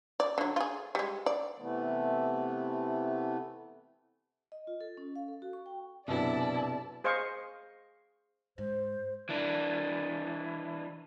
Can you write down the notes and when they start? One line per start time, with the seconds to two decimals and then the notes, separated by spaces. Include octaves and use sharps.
0.20 D5
0.38 D3 F#3
0.56 F4 G#4
0.95 G3 G#3
1.26 D5
1.57 C3 E3 A3 B3
4.52 D#5
4.67 F4
4.81 A4
4.97 C#4
5.16 F5
5.28 A4
5.42 F#4
5.53 C#6
5.66 G5
6.08 F#1 B1 C3 B3 D4 E4 D5 A5
7.04 G#4 C5 D#5 F5 C#6
8.58 G#2 C5
9.29 E3 D4